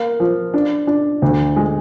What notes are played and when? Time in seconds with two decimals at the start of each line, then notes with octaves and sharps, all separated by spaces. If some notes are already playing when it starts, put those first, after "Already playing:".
Already playing: A#3
0.20 F3
0.54 D4
0.87 D4
1.22 D2
1.56 G#3